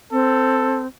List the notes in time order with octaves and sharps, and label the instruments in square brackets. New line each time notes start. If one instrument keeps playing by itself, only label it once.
[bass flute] C4 [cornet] A4